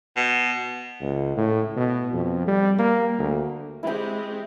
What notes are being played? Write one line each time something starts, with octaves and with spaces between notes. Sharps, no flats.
B2
C#2
A2
B2
F2
G3
A#3
D2
G#3 C4 E4 G4 B5